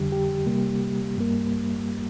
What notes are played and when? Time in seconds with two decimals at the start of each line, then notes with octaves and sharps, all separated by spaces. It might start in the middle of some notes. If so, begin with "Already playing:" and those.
Already playing: F2 D3 G3 G4
0.12 G4
0.46 C3 G3 A#3
1.16 G2 G3 A#3